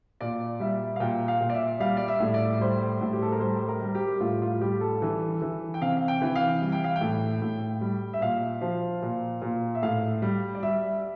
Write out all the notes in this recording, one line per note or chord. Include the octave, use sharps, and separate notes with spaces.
A#2 D5
G3 E5
F5
A#2 G5
F5
A#2
D5
E5
G3 F5
D5
E5
A2
D5
G3 C5
A2
G4
A4
A#4
G3 C5
A#4
G3
G4
A2 F4
F4
G3 G4
A4
E3
E3
G5
C3 F5
F5
G5
E3
F5
G3
G5
F5
G5
A2
A2
G3
E5
A#2 F5
F3
A#2
A#2
E5
A2 F5
G3
D5
G3 E5